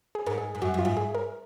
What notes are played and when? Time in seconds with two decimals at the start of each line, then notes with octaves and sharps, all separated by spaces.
0.15 G#4
0.26 G#2 A#4
0.38 G#4
0.55 G#2
0.62 F#2 F#4
0.74 F#2 F4
0.85 G#2
0.97 G#4
1.15 A#4